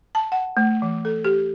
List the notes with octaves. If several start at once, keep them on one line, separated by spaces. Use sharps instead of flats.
A5
F#5
A3
E3
A4
G4